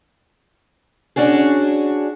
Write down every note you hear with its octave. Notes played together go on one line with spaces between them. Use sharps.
C#4 D4 F#4 G#4